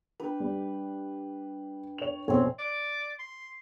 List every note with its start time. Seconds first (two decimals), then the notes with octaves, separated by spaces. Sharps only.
0.20 D4 B4 G5
0.40 G3
1.98 C#5 F7
2.28 A#1 F2 B2 C4 C#4
2.59 D5
3.19 C6